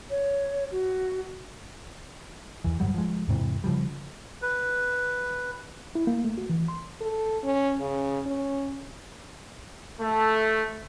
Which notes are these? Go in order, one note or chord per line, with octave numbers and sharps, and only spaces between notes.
C#5
F#4
E2 E3
G1 G#2 F#3 G3
F3 G#3
E2 G#2 C3 E3
C#3 F3 G3
B4
E4
A#3
A3
F#4
E3
C6
A4
C#4
C#3
C#4
A3